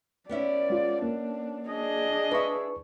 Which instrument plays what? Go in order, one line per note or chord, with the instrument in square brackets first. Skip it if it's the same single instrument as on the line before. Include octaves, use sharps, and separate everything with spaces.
[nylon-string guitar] B3 C#4 E4 [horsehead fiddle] D5
[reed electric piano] G#3 F4
[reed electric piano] A#3 [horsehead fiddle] D4
[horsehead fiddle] D4 G#4 [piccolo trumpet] D#5
[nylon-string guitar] E4 E5 [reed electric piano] B4 C#6